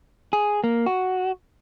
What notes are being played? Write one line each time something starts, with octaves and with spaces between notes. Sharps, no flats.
G#4
A#3
F#4